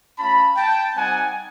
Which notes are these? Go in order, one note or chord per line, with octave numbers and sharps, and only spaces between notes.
A3 C#4 F4 A5 B5
G5 A5
G3 C4 D#4 F#5 G#5